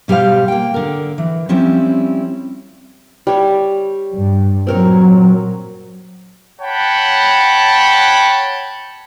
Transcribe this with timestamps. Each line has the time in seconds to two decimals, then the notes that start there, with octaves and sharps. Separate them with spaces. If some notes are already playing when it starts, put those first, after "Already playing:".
0.08 B2 G3 G4 C5 F5
0.48 A#3 G5
0.74 D3 A#4
1.18 E3
1.49 F3 G3 C4 C#4 E4
3.27 G3 C#5
4.14 G2
4.67 A#2 F#3 C4 A#4 C#5
6.61 C#5 F#5 G5 A5 B5